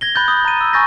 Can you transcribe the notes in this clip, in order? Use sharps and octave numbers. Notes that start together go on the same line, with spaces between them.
G#6 A#6 G7
B5 F#6 G6 A6
D#6
A#5 D#7
E6
G#5 C#6 G6 A6 A#6